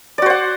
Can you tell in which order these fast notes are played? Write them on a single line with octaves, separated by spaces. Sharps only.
D5 F#4 C5 F#5